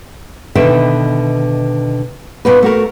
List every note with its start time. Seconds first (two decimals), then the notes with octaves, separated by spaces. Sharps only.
0.55 B2 D3 D#3 B4 E5 G5
2.45 A#2 A#3 B3 D#4 F#4 B4
2.62 A3 F#4 A#4